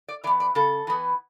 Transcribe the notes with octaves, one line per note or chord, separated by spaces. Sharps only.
D5
E3 B3 D5
D5
C#3 A4
E3 B3